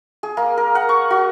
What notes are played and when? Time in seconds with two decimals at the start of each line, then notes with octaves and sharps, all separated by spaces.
0.23 G#4
0.37 A#3
0.57 A#4
0.75 F#5
0.89 C#6
1.10 F#4